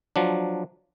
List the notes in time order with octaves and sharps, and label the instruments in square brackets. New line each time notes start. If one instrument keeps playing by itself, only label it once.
[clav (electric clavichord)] F3 F#3 D4